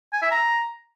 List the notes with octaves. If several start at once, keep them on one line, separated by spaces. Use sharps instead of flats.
G#5
E5
A#5